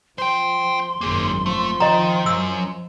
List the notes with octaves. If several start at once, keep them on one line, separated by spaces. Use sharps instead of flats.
F3 C5 G5 C6
G#1 F#2 A#3 G#4
F3 A3
D#3 D#5 A#5
F#2 E6